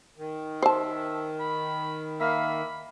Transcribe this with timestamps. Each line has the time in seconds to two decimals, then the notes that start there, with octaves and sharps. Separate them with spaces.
0.18 D#3
0.62 C5 E5 A5
1.40 B5
2.20 A#3 E5 F5 B5